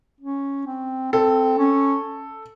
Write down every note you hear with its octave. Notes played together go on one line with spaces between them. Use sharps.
C#4
C4
C4 A4
C#4